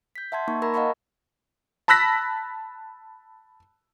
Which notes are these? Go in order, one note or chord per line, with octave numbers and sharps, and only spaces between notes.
G6 B6
E5 F#5 A5 C6 G#6
A#3 D#4 A5 C#6
A#4 A#5 B5 E6 G#6 A#6
D#5 F5 F#5 A5 B5 C#6
A5 B5 E6 F#6 A#6 B6